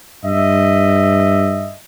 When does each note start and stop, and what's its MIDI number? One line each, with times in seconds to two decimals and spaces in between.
0.24 1.71 43
0.24 1.77 75
0.24 1.77 76